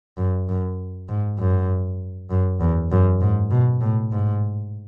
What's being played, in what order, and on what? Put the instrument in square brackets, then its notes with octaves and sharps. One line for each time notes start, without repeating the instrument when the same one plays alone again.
[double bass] F#2
F#2
G#2
F#2
F#2
E2
F#2
G#2
B2
A2
G#2